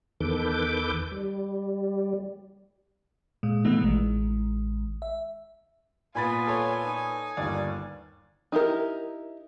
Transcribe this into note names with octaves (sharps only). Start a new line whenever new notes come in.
E2 D#3 A4 B4 D6 G6
G3
A#2 G#3
B2 E3 A3 B3 D#4
A1 D#3 G#3
E5
A#2 B3 F4 G#5 B5 A6
A4 C#5
D#4
G1 D#2 D5
D#4 E4 G4 A#4